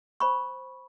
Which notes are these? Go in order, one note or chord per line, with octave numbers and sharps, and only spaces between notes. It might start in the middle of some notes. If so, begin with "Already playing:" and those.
C5 B5 C#6